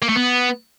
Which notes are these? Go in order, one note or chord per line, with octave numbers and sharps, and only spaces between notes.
A#3
A3
B3